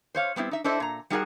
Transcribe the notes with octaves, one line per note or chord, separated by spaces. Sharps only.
C5 C#5 F5
G3 B3 C4 E4
D#4 E5
D4 E4 A4 C5 D#5 E5
A#2 A#5
G3 D#4 F#4 G#4 A#4 F#5